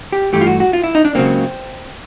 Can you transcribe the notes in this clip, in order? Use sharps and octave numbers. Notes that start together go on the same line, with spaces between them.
G4
G2 E3 A3 G4
F4
F#4
F#4
F4
E4
D#4
D4
C#2 C#3 F#3 A#3 C4